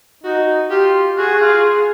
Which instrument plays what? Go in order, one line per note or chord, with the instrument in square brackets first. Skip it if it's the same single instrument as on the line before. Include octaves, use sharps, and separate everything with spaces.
[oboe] D#4 [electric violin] F#4
[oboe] F4 [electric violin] G4
[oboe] F#4 [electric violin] G#4
[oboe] F#4
F4